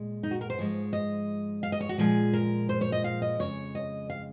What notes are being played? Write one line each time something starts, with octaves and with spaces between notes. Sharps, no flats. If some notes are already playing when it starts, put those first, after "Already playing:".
Already playing: A#2 G#3
D#4
F#4
A#4
C5
G#2 F3 G#3 C#5
D#5
F5
D#5
C#5
F#4
A#2 F3 G#3 G#4
A#4
C5
C#5
D#5
F5
D#5
F2 C#3 G#3 C#5
D#5
F5